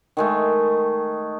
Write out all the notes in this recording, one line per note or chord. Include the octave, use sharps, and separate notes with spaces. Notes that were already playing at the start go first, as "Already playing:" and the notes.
D#3 G#3 A3